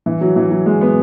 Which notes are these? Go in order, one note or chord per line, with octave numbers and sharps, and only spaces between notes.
E3
F#3
E3
F#3
G#3
B3